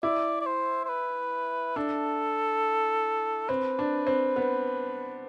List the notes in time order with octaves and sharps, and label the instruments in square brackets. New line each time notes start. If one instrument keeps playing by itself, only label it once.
[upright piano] E4 [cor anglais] D5
[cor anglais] D5
C5
C5
B4
[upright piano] D4 [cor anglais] A4
[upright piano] C4 [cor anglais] B4
[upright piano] D4
C4
B3